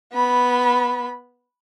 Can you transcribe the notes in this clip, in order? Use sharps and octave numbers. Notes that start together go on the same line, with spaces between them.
B3 B5